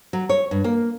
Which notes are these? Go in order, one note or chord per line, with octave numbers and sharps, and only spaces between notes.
F#3
C#5
G2
A#3